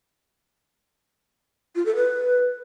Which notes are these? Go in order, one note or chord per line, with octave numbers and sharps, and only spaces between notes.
F4
A4
B4